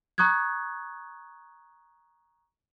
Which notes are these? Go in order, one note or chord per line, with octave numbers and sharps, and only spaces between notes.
A#5 C#6 D#6 F#6 G#6